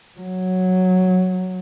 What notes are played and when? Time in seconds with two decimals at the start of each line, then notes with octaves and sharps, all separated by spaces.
0.20 F#3